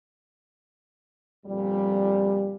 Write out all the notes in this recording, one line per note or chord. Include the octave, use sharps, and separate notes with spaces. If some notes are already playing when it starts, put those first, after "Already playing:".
G1 F2 A#2 G3